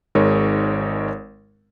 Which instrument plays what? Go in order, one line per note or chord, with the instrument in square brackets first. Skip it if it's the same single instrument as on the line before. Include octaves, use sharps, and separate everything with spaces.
[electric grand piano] G#1 G#3 D#4 A#4 C#5